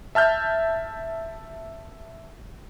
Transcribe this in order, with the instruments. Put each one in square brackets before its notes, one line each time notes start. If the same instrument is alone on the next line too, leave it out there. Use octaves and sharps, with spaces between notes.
[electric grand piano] E5 A5 F6 G6